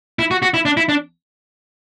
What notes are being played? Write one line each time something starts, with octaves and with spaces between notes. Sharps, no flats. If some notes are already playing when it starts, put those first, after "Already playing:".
E4
F#4
F#4
E4
D4
E4
D4